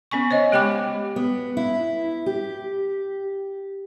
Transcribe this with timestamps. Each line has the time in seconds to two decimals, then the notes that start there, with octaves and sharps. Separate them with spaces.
0.11 B3 C#4 G#5 C#6
0.31 C5 C#5 D#5
0.52 G#3 G4 G5 B5 D6
1.16 B3
1.57 E4
2.26 G4